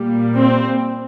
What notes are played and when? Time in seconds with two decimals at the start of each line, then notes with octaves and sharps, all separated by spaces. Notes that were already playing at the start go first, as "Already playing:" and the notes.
Already playing: A#2 G3 A#3
0.37 C4